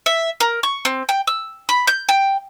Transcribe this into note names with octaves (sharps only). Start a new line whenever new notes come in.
E5
A#4
C#6
C4
G5
E6
B5
G6
G5